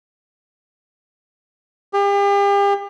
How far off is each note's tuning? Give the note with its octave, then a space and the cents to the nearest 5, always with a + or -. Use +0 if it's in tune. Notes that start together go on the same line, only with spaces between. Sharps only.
G4 +40